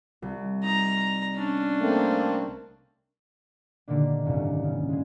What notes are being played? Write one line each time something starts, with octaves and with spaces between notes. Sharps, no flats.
C2
D#4 A#5
C#4 D4
A3 A#3 C4
A#2 D3 D#3 A#3 D4
F#1 C2 G#2 C3
C#3
G#3 G#4